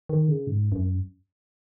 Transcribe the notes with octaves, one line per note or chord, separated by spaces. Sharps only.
D#3
C#3
G#2
F#2